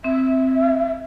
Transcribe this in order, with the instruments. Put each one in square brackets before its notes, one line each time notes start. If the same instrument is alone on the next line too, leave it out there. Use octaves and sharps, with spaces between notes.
[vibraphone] C4 [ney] E5